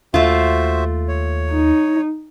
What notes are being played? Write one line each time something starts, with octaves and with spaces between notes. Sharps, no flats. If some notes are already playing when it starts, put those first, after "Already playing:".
D#2 A3 F4 F#4 C5 E5
C#5
D#4